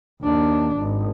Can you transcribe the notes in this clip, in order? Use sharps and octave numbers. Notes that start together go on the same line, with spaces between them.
D#2 D4
G#1